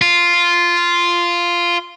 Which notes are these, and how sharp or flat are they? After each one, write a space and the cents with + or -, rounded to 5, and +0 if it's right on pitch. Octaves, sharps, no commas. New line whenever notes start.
F4 -5